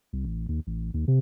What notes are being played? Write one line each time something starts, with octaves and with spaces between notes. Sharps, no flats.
C2
A1
D#2
A1
D#2
C3